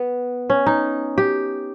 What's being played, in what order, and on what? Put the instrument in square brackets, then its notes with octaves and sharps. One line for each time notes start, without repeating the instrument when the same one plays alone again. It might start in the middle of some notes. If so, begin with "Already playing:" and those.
Already playing: [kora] B3
C#4
D#4
G4